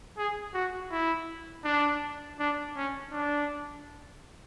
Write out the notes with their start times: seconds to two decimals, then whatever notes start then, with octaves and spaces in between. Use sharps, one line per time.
0.17 G#4
0.54 F#4
0.91 E4
1.64 D4
2.39 D4
2.76 C#4
3.12 D4